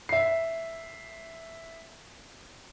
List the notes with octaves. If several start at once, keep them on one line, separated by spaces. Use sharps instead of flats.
E5 C7